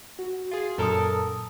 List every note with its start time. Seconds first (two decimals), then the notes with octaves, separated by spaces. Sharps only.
0.19 F#4
0.51 F4 G#4
0.78 F#2 A#2 A4 A#4 A5 D#6